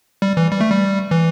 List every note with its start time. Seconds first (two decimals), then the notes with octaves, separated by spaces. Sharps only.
0.22 G3
0.37 E3
0.52 G3
0.61 A3
0.70 G3
1.11 E3